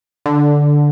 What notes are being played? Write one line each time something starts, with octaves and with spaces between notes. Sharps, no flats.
D3